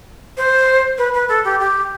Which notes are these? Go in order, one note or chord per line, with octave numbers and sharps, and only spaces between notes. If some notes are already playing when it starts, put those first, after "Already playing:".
C5
B4
B4
A4
G4
G4